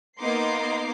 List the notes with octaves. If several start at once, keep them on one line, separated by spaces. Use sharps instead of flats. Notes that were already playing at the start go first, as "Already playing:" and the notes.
A#3 B3 D#4 C6 D6 C7